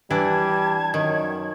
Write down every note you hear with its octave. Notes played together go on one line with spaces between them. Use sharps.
E3 G3 D4 A5 G#6
F#2 D#3 C#5